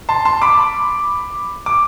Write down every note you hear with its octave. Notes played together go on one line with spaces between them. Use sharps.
A5 C6
A5 C6
B5 D6
D6